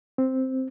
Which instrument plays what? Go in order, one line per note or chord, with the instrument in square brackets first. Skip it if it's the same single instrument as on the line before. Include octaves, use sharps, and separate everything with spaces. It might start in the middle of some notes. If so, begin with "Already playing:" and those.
[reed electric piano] C4